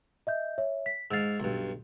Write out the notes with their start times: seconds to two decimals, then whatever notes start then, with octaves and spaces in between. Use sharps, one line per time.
0.27 D#5 E5 G6
0.58 C#5 E5
0.86 B6
1.11 G#2 F5 E6 A6
1.40 B1 G2